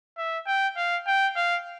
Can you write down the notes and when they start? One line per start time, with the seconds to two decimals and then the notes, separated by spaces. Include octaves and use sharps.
0.18 E5
0.47 G5
0.77 F5
1.07 G5
1.36 F5